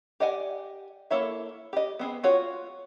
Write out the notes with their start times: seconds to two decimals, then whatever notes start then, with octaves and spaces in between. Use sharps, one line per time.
0.20 G4 D5 D#5 F#5 G#5
1.10 A#3 E4 A4 C#5 E5
1.73 G4 D#5
1.99 B3 C4 G#4
2.24 F4 F#4 C#5